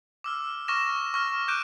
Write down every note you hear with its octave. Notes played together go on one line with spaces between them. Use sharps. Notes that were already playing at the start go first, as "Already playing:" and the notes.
D6 E6 F6
C#6 D6 F6 A#6 E7
C#6 F6
D6 F#6 G6 D7 D#7